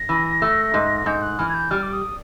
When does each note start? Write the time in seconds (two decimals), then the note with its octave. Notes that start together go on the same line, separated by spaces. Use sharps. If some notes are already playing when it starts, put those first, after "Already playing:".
Already playing: A#6
0.09 E3
0.42 A3
0.74 G#2
1.06 G#2 G6
1.22 F#6
1.39 E3 F6
1.49 G#6
1.54 G6
1.71 G3 F6
1.83 D6
1.93 D#6